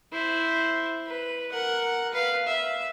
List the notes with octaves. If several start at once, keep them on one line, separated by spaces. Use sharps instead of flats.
E4 C5
B4
A#4 F#5
B4 F5
E5